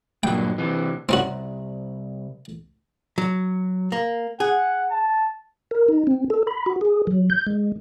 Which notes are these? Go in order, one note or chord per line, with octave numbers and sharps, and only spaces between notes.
G2 A#2 F#3 G5
C3 E3
C2 C4 C#4 F#4
F#3
A#3
G#4 F#5
A5
A#4
D#4
C4
A4
B5
F#4
G#4
F#3
G6
G#3